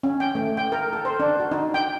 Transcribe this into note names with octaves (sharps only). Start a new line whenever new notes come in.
C#4
G5
A3
G5
A#4
A4
C5
D4
F#4
D#4
G5